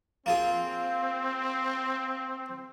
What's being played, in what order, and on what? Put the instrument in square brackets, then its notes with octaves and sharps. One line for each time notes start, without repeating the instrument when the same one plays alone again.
[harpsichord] A#3 F4 G#4 [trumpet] C4